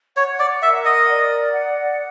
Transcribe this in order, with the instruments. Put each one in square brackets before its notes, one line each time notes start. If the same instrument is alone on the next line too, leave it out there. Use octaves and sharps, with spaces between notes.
[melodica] C#5 [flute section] F#5
[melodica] D5
[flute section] A#4 [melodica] E5
[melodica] D#5
[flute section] D5
F#5